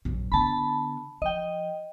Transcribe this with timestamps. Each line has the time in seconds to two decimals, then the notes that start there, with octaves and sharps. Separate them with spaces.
0.05 A#1 F#2
0.32 D3 B3 A5 B5
1.22 F3 D#5 G5